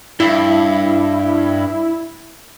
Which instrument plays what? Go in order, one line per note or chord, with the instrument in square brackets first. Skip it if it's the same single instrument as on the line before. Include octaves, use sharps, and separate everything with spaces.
[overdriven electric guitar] G2 [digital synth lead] E4